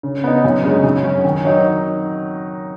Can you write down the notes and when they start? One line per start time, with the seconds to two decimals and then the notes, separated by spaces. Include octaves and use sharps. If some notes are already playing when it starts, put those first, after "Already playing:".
0.03 C#3
0.24 B3 D#4
0.44 F#2
0.64 C#3 G#3 D#4
0.84 F#2
1.04 F#3 C#4
1.24 D#3
1.45 F#3 D#4